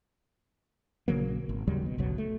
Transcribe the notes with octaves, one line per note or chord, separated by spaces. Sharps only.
A#1 C#3 F#3 A#3
G#1
D#2 C#3 F#3 G3
B2
G1 C#2 B2 F#3
A3